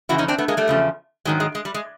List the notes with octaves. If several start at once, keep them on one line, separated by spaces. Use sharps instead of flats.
F2 C#3 E3 E4 F#4
C#4 D#4
C4 D4
A3 B3
G#3 A#3
G3 A3
E2 C#3 F3
G#2 D#3 F#3 G#3
G#3
G#3
G3
G#3